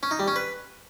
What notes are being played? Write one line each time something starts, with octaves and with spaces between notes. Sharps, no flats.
C#4
D#4
G3
C#4
B4